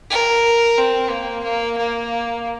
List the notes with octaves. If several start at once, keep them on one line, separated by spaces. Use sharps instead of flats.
A#4
C4
A#3
A#3
A#3